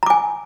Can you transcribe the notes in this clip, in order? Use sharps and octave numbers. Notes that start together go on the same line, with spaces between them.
G#5 A#5 D6